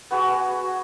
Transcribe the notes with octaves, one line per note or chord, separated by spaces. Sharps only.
B3 F#4 G#4